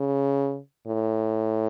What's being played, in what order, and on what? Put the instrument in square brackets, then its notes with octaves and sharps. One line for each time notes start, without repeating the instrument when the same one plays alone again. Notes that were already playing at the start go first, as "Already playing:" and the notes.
Already playing: [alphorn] C#3
A2